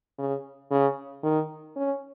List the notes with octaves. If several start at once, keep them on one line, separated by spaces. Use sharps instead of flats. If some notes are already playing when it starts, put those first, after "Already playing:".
C#3
C#3
D#3
C#4